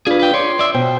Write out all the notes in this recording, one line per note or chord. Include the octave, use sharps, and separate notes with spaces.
D4 F4 G#4 B4
B4 G5
C#5 D5 C6
D5 E5
B2 C5 G5